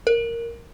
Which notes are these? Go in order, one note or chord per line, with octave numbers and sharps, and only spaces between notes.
A#4